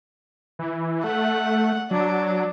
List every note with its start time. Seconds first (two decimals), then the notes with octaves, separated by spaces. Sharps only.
0.59 E3
1.04 A3 F#5
1.91 F#3 D4